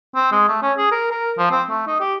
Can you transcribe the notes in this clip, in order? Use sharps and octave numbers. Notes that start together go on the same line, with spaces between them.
C4
G#3
A3
C#4
G#4
A#4
A#4
F3
C4
A3
D#4
G4